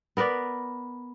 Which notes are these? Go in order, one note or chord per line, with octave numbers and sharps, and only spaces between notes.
B3 A#4 B4 D5